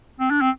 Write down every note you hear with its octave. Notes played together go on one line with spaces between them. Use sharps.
C4
D4
C4